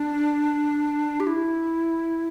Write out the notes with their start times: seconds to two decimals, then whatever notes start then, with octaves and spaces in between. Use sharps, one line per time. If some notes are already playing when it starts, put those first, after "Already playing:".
Already playing: D4
1.20 G4
1.27 E4